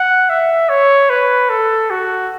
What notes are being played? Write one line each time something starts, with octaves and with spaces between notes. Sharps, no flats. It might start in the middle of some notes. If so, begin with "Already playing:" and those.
Already playing: F#5
E5
C#5
B4
A4
F#4